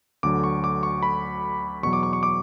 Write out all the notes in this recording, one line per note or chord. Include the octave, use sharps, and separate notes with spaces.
D2 D3 F#3 D6
C#6
D6
C#6
B5
E2 B2 F#3 C#6
D6
C#6
C#6
D6